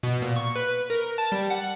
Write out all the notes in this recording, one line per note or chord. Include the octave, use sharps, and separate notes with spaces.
B2
A#2
C#6
B4
A#4
A5
G3
F#5